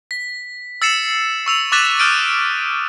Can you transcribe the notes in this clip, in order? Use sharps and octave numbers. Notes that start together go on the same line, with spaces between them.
B6
E6 A6 C7 C#7 E7
C#6 E6 F7
C#6 D6 F#6 A6 B6 E7
D#6 F6 G6 D7 D#7